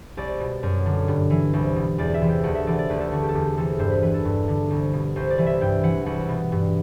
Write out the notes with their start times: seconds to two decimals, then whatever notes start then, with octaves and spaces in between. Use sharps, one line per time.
0.17 C2 D5
0.40 B2
0.63 F#2
0.86 D3
1.08 G2
1.30 E3
1.53 C2
1.76 B2
1.98 E2 D5
2.14 E5
2.21 C3 E3
2.29 G5
2.43 D2 F#5
2.55 E5
2.67 C3 E3 D5
2.79 D5
2.89 D2 B4
2.95 G4
3.01 A4
3.11 D3 F#4
3.23 G4
3.29 A4
3.34 E2 G4
3.57 C3 E3 A4
3.79 G2 C5
3.91 B4
4.02 E3 B4
4.14 A4
4.25 G2
4.48 D3
4.70 C2
4.93 B2
5.16 C2 C5
5.30 D5
5.38 C3 E3
5.46 E5
5.61 G2 G5
5.83 E3 F#5
6.06 C2 F#5
6.29 B2
6.52 G2